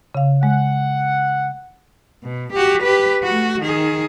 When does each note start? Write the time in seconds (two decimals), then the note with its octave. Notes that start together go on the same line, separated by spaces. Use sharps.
0.15 C#3 F5
0.43 G#3 F#5
2.24 B2
2.52 F#4 G4
2.82 G4 B4
3.23 A3 F#4
3.60 D#3 G#4